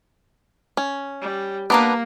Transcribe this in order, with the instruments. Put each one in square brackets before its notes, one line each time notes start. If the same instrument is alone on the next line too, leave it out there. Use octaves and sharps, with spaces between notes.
[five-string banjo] C#4
[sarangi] G3
[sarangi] A#3 [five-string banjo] B3 D4 [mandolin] B4 A#5 D6